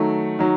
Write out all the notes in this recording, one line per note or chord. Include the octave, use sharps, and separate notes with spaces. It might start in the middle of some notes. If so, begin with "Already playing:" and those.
Already playing: D#3 F#3 A3
D#3 F#3